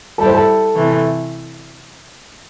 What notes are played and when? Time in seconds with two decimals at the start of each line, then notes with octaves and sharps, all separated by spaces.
0.18 G3 E4 G4 A4
0.26 C5
0.34 A4
0.74 C3 E3 A3